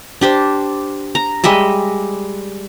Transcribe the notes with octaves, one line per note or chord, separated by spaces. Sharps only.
D4 G4 C5
A#5
G3 G#3 D#5 E5